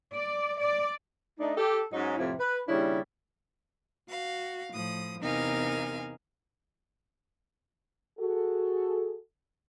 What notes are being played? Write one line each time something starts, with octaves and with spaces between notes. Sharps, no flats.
D5
D5
A3 D4 D#4
G4 A4
G#2 F#3 C#4 D#4
F2 A2 C3 F3 E4
B4
D#2 C#3 G3 D4 E4
F#4 F5
A2 F3 D#6
E2 C3 D#4 A#4 F5 G#5
F#4 G#4 A4